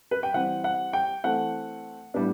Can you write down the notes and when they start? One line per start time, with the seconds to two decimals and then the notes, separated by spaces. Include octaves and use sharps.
0.11 B4
0.23 G5
0.34 E3 G3 C4 F#5
0.64 F#5
0.93 G5
1.24 E3 A3 C4 F#5
2.14 A2 G3 B3 D4